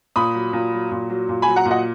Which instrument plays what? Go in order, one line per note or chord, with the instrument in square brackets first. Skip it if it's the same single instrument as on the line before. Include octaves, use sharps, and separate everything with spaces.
[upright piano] A#2 B5 D#6
F#3
A#2
F#3
A#2
F#3
A#2
F#3 G#5 B5
F#5 A#5
A#2
D#5 F#5